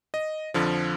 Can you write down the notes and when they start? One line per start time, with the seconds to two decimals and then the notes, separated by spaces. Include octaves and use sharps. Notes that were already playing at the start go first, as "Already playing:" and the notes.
0.14 D#5
0.54 F2 D3 F3